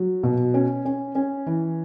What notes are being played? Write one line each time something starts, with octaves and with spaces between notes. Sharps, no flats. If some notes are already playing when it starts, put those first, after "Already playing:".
Already playing: F#3
B2
C#4
C#4
C#4
E3